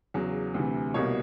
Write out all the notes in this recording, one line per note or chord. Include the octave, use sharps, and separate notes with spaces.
E2 C#3 F#3
D2 C3 E3
C2 B2 G3 A#3 C#5